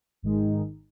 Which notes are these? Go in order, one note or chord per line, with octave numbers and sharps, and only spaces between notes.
G#1 G#2 D#3 G#3 D#4